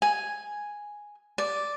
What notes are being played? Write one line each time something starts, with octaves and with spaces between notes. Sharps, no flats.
G#5
D5